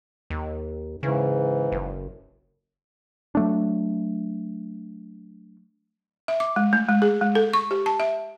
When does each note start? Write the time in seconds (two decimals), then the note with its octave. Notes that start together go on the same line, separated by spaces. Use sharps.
0.30 D#2
1.03 G#2 C#3 E3
1.72 F#1
3.35 F#3 A3 D4
6.28 E5
6.40 D6
6.56 G#3
6.73 A3
6.89 G#3
7.02 G#4
7.21 G#3
7.35 A4
7.53 C#6
7.71 G4
7.86 A5
8.00 E5